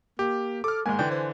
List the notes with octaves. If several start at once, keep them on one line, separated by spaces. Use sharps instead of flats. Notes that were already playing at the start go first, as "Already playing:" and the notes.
A#3 G4
A4 D6 F6
G#2 D#3 G#3 A#3 G#5
D3 E3 G5
C5